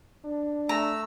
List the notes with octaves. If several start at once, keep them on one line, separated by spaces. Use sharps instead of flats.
D4
A3 A#5 E6